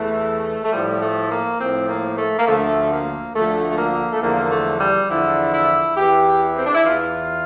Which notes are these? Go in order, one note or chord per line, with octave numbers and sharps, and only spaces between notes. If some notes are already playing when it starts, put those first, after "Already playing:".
Already playing: E2 E3 A3
A3
A2 F3 G3
A3
A#3
A2 F3 C4
A#3
A3
A#3
D2 D3 F3 A3
A#3
D2 D3 F3 A3
A3
A#3
A3
E2 D3 F3 A#3
A3
G3
E2 D3 F3 E4
E4
E2 E3 G4
C4
D4
E4
E2 E3 F4